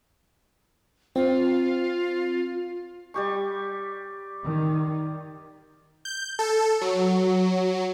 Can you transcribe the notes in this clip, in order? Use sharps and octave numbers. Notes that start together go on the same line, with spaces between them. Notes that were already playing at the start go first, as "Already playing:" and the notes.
C4 F4
G3 G4 C#6
D#3
G6
A4
F#3